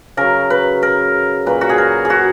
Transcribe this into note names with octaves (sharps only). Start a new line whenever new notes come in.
C#3 F#3 A#4
B4
A#4
A#2 F#3 B4
F#4
G#4
A#4
G#4
F#4